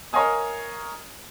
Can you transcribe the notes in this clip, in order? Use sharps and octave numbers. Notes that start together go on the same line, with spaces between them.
A#4 C#5 D#5 F5 G#5 D#6